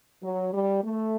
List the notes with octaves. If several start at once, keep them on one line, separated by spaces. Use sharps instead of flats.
F#3
G3
A3